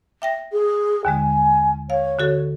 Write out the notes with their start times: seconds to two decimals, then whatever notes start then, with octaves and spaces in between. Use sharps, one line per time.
0.22 E5 G5 A#6
0.52 G#4
1.05 D#2 D3 G#3 G#5
1.90 C#5 F5
2.19 D3 F#4 A4